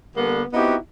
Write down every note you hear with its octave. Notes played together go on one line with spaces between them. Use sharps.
D3 G3 A#3 B3
B3 C4 D#4 E4 F#4 G4